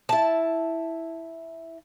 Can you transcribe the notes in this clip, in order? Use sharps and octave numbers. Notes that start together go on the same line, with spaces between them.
E4 A5